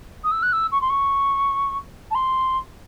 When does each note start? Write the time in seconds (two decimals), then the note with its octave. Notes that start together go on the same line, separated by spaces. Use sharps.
0.24 D#6
0.32 E6
0.43 F#6
0.53 E6
0.72 C#6
0.81 C6
0.90 C#6
2.11 A5
2.15 C6